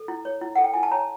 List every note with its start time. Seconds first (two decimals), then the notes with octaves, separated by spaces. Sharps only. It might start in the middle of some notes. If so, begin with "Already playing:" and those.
Already playing: A4
0.08 E4
0.25 C#5
0.41 E4
0.56 A4 F#5
0.64 G5
0.74 E4 G#5
0.83 A5
0.91 C#5 A#5